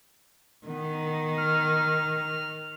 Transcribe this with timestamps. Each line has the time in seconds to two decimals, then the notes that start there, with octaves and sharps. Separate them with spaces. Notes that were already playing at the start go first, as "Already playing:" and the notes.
0.67 D#3 B3
1.38 F6